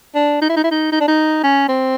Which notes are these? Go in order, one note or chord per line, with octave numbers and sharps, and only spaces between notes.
D4
D#4
E4
D#4
E4
D#4
D#4
D4
D#4
C#4
C4